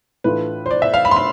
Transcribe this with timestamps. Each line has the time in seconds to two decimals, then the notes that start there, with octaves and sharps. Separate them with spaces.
0.24 A2 E3 A3 D4 F4 B4
0.66 C5
0.71 D5
0.82 E5
0.94 F5
1.05 B5
1.11 C6
1.17 B5